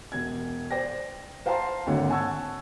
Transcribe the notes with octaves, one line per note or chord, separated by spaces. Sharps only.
E1 G#6
C5 D5 G5 A#6
C5 F5 G5 A5 A#5 C6
G#1 D#2 D3 C#5
F#5 G#5 A5 C#6 E6 G#6